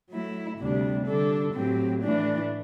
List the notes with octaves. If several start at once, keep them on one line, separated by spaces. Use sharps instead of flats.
F#3 A3 E4
D2 C3 G3 D4
D3 G3 D4 A4
A2 F#3 C4 G4
A2 E3 A3 D4